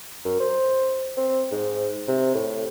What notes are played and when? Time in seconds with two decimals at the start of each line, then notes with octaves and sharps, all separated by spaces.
0.25 F#2
0.40 C5
1.17 C4
1.51 G#2
2.08 C3
2.34 A2